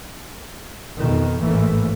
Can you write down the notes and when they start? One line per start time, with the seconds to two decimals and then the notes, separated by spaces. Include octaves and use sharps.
0.97 F2 B2 D#3
1.40 A1 D#2 G#2 E3 A3 A#3